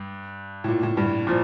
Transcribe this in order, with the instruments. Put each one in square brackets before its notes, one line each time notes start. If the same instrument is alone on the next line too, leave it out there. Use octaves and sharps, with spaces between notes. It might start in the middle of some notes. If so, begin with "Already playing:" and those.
Already playing: [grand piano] G2
[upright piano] A2
A#2
A2
G2
[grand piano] A#2 F3